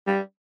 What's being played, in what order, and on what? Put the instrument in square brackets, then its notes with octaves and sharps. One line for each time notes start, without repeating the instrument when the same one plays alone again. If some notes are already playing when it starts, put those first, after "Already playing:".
[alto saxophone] G3